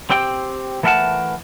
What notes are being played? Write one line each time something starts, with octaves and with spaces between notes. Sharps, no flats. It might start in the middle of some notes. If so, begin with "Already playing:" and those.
C4 G4 G5
E3 A3 A4 A#4 F#5 A5